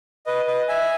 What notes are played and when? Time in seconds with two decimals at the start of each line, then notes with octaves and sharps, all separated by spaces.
0.26 B4 D#5
0.47 B4 D#5
0.68 E5 G#5